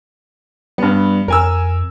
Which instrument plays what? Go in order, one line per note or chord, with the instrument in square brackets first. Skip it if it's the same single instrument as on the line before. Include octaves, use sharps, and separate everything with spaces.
[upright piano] G2 B3 [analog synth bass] G3
[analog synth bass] F2 [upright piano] A#4 G#5 E6